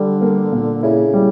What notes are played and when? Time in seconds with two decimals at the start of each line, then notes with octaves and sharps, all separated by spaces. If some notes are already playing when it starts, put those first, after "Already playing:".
Already playing: D3 G3
0.21 A#3
0.52 A#2
0.83 C#3 E4
1.13 G3